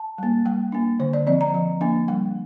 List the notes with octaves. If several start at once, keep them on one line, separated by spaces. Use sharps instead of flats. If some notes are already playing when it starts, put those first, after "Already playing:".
Already playing: A5
G3 A#3
G3 G5
A#3 D4
D3 C5
D5
F3 C4 D5
A#5
F3
A#3 D4
G3 G5